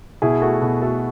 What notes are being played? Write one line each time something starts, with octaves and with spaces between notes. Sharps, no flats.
B2 E4 G#4
A3 F#4 A4
B2
A3 F#4 A4